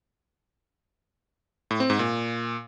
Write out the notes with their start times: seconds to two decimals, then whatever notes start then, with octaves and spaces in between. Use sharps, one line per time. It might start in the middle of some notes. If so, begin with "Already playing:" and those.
1.71 A2
1.80 C4
1.90 G#2
1.99 A#2